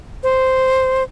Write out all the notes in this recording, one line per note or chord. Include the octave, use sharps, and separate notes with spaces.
C5